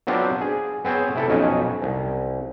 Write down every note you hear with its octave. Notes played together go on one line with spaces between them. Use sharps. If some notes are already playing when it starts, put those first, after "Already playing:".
F#3 B3 C4 D4 F4 G4
G#4
B3 C4 G#4 C5 C#5
C3 E4 A4
B1 F2 C#4 D#4 F#5 G#5
C2